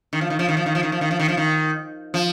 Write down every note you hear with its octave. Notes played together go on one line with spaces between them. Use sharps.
D#3
F3
D#3
F3
D#3
F3
D#3
F3
D#3
F3
D#3
F3
D#3
F3
D#3
F3